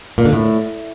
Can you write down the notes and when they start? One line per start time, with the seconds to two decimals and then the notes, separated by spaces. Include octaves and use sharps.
0.18 A#2
0.25 D3
0.33 A2